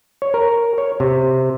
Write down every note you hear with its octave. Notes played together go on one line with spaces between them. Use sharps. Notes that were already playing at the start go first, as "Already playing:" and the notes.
C#5
A#4
C#5
C3